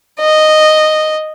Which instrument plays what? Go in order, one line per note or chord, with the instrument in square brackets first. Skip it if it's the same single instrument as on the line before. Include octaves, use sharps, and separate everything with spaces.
[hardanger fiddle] D#5